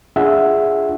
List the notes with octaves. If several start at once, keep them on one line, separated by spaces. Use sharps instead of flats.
D4 F4 G#4 E5 F#5